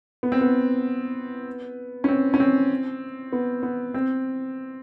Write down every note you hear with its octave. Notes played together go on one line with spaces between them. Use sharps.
B3
C4
B3
C#4
C4
C#4
C4
B3
B3
C4